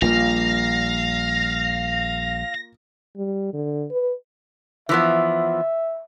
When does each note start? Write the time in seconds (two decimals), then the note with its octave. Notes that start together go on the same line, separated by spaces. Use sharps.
0.02 A#1 G3 A#3 F4 F5 A#6
3.17 G3
3.54 D3
3.91 B4
4.89 E3 F3 B3 E5